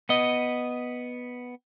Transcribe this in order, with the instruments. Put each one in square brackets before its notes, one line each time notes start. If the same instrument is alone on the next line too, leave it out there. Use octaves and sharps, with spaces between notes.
[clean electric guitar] B3 D#5